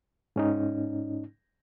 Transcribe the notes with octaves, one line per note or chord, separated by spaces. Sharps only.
G#2 C#4 D#4